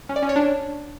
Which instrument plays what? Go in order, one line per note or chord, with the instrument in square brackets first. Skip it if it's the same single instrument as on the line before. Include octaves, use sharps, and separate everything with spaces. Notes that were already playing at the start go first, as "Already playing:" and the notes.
[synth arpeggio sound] C#4
D5
C#4
C#5
D4